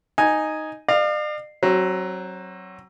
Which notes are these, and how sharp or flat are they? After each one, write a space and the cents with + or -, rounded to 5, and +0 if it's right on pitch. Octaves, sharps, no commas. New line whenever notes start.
D#4 +0 G#5 +0
D5 +45 F5 +0
F#3 +15 C4 +35